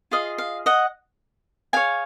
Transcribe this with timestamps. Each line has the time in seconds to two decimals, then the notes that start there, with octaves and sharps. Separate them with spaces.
0.11 F4 G#4 D#5 F5
0.38 F5
0.66 D#5 F#5
1.73 G#4 C#5 F5 G#5